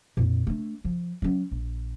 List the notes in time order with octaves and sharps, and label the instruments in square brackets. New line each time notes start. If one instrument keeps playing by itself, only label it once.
[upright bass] F2 A#2
A3 D4
F3
F#3 C#4
A#1